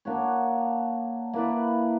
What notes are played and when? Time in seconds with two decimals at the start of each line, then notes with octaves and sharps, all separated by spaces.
0.05 A#3 D4 F#4 C#5
1.33 A#3 E4 B4 D5